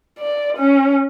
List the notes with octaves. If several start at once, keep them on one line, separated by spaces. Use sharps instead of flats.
D5
C#4